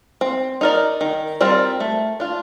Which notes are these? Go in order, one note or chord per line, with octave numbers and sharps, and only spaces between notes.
C4
D#4 A#4 D5
D#3
G3 C4 F4 A#4
A3
D4 F4